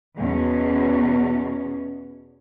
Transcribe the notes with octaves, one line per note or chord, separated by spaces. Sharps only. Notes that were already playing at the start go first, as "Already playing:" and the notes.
E2 B2 C#4